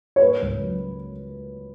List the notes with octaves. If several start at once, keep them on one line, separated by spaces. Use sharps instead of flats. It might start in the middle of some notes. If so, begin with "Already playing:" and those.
C#5
A#3 B4
C#2
F#3